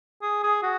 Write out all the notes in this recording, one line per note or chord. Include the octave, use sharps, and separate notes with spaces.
G#4
G#4
F#4